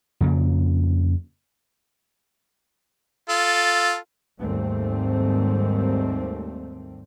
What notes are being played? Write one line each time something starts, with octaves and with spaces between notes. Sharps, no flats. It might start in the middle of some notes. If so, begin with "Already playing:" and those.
F2 C#3 A#3
F4 A4
D#2 G#2 G3 A3 C4